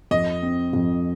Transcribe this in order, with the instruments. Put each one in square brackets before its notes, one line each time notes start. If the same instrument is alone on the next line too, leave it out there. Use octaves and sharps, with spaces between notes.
[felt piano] F2 [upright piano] D#5
[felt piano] C4
F2